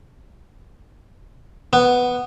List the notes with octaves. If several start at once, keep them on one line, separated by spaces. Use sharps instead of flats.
B3